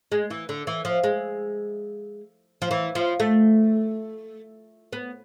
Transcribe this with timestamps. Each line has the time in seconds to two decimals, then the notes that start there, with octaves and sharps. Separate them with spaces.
0.12 G#3
0.30 E3
0.49 D3
0.67 E3
0.85 F3
1.04 G#3
2.62 F3
2.71 E3
2.95 F3
3.20 A3
4.93 B3